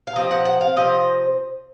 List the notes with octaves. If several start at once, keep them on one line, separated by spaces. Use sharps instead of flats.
F5
C3 F3 C4 D#5
F#5
F#5
F5
C3 F3 C4 D#5